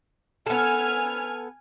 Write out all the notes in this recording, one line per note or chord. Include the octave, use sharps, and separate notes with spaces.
B3 A4 G#5 F6